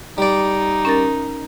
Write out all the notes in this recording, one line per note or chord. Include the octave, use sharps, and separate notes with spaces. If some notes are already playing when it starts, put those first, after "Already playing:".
G3 D#4 D5
C#4 A#4 A6